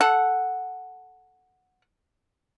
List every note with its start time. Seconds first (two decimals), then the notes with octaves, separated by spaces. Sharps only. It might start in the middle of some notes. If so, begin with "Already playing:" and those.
0.01 A4 F#5